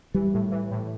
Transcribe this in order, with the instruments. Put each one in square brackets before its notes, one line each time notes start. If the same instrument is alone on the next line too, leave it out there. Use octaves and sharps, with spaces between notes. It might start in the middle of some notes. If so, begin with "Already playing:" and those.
[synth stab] E3 [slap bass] G3
[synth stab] A2
E3
A2